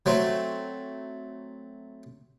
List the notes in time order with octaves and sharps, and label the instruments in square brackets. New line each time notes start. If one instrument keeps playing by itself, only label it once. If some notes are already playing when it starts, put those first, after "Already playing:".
[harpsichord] F#3 A3 C4